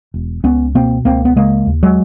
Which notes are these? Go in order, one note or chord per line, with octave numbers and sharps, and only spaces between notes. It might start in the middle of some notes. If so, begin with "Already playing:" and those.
E1
C#2 B3 C#4
B2 A#3 C4
C#2 A#3 C4
B3
C#3 G#3 A#3
D#2
F#3 G#3